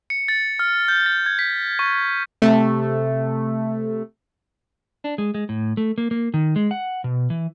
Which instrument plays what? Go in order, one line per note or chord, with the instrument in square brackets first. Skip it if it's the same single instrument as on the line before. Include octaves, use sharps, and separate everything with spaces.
[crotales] C#7
A6
F6
G6
A6
G#6
B6
C#6
[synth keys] C3 A3
[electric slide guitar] D4
G#3
G#3
A2
A3
A#3
A#3
D#3
G#3
F#5
B2
E3